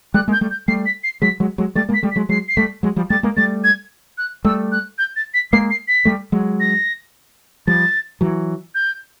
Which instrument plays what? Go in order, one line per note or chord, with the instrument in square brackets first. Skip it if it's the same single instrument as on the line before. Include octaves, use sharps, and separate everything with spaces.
[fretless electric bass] G3 A3 [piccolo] F#6
[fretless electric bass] G#3 A#3
[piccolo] G6
[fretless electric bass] G3 A3
[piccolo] G6
[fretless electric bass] G3 A3 [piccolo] C7
[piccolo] B6
C7
[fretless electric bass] F#3 G#3 [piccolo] B6
[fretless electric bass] F#3 G#3
F#3 G#3
[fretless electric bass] G3 A3 [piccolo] A6
[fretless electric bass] G#3 A#3
[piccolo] B6
[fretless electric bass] G3 A3
[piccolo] B6
[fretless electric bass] F#3 G#3
[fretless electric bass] F#3 G#3 [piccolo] C7
[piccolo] C7
[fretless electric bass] G3 A3 [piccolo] B6
[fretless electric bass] F#3 G#3
F3 G3
[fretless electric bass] G3 A3 [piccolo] A6
[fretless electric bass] G#3 A#3
[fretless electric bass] G3 A3 [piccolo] A6
[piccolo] G#6
F#6
[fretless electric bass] G3 A3 [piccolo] E6
[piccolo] F#6
G6
A6
B6
[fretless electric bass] G#3 A#3 [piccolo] C7
[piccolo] C7
B6
[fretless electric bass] G3 A3
F#3 G#3
[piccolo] A#6
[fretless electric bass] F3 G3 [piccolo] A6
[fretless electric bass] E3 F#3
[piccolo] G6